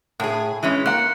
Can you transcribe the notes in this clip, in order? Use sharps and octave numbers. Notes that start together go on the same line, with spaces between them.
A2 G#4
E3 G#3 C#4
A#3 F#5 F#6 C#7